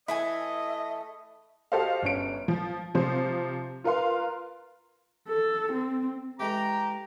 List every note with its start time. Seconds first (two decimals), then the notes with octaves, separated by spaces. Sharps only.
0.08 E3 A3 E4 D#5 E5 G#5
1.72 F#4 G4 A4 C5 D#5 F5
2.02 G1 C#4 D7
2.48 F3
2.94 C3 F3 C5
3.84 F4 A#4 B4 F5 C6
5.28 A4
5.73 C4
6.40 E3 G#3 A3 G4 A#5